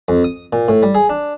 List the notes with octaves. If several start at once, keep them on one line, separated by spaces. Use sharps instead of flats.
F2
D#6
A#2
A2
G3
G#4
D4